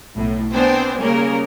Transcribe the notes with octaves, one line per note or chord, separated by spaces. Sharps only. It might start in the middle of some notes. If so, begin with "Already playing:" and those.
B1 A2
B3 C4 D4 C5 G5 G#5
C#3 G3 A#3 C#4 A#4